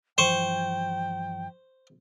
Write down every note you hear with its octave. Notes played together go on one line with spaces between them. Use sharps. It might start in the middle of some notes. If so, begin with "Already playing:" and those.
G2 E3 F3 C5 G5 C#6